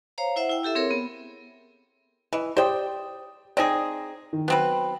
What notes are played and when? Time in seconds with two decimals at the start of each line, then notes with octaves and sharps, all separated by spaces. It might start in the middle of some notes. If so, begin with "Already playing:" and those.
0.18 C5 C#5 F5 A#5
0.36 E4 C5 E5 F#5
0.49 E4 G5
0.63 E4 G4 A4 E5
0.75 C4 G#4 A#4 C#5
0.91 B3
2.33 E3 D#5
2.57 G4 C5 D5 G5 D#6
3.57 C4 D#4 G#4 D5 A#6
4.33 D#3
4.48 F#3 B3 C4 B4